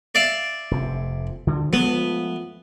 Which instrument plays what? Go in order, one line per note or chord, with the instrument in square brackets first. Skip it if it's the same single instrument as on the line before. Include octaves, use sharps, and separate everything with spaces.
[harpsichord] D5 E5 F5
[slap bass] F1 F2 C3
D2 D3
[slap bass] F3 G#3 A3 [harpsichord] B3